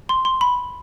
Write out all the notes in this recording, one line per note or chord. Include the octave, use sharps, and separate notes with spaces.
C6
C6
B5